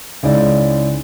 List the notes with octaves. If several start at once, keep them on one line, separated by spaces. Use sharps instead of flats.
C#2 G#3 C#4 D#4 E4 D5